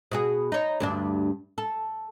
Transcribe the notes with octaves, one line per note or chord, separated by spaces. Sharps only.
B2 F#4 G#4
D#4 C#5
D2 G2 D4
A4